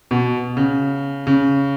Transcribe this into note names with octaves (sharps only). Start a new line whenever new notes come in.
B2
C#3
C#3